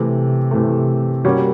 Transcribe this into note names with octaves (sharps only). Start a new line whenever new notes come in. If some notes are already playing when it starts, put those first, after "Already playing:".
Already playing: C3 E3 A3
C3 E3 A3
G3 A#3 C#4 F#4